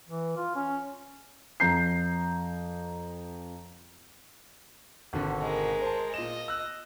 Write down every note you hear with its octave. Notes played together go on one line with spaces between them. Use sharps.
E3
F4
C#4
F2 A#5 G6 C7
G#1 B2 D3
G#3 A#4
C5 A5
A#2 D#5 E7
E6 F#6